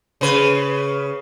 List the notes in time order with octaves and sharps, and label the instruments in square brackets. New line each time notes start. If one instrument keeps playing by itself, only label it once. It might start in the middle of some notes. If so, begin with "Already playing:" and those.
[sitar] C#3 B4